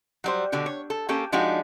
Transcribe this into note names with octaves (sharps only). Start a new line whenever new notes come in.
F#3 G3 C5
B2 D3 F#4 G4
C#5
A4
A#3 C#4 G4 A4
F3 G#3 D4 D#4 F#4 G4